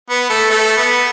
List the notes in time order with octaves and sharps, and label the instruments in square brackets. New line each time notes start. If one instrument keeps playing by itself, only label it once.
[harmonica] B3
A3
A3
B3